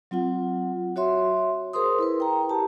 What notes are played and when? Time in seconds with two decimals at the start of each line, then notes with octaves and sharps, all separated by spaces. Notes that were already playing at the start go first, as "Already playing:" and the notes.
0.11 F#3 C4 F4 F#5
0.96 F#4 C#5 E5 C6
1.73 G#4 A#4 C5 C6 D#6
1.99 E4 A#4 B4
2.20 G5 A#5
2.50 G4 A5